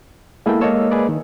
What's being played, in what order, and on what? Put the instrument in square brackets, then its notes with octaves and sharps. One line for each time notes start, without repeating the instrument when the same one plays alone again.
[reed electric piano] G#3 B3 G5 [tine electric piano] A#3 E4 A4
[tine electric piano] G#3 A#3 D#5 [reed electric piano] A4 C#5 E6
[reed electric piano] G#4 B4 D5
D#3